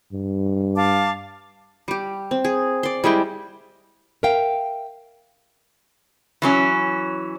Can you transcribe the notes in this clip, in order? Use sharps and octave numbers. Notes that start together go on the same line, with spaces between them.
G2
F5 A5 D6
G3 G4
C4
G#4
D5 C6
G3 G#3 E4 G5
A#4 E5 F5 G5
E3 F#3 C#4